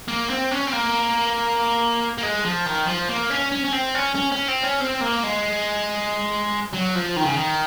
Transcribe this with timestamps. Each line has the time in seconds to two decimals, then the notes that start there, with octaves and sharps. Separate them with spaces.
0.08 A#3
0.30 C4
0.51 C#4
0.68 C4
0.73 A#3
2.18 A#3
2.23 G#3
2.44 F3
2.66 D#3
2.87 F3
3.09 A#3
3.30 C#4
3.51 C#4
3.65 C#4
3.73 C4
3.95 C#4
4.16 C#4
4.32 C#4
4.48 C4
4.64 C#4
4.81 C4
5.01 A#3
5.24 G#3
6.73 F#3
6.95 F3
7.17 D#3
7.25 C#3
7.34 D#3